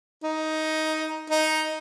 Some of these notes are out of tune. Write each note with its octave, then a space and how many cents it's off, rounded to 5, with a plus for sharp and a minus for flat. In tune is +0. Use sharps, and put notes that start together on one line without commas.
D#4 +10
D#4 +5